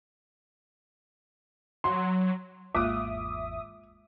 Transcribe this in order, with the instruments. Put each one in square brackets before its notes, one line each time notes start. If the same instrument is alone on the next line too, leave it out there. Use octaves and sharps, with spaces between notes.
[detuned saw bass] F#3 [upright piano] C6
[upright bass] G#1 E2 [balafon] G#3 A#3 F4 [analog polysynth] E5 D#6 [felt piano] D6